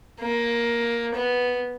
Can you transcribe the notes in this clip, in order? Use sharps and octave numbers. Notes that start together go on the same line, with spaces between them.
A#3
B3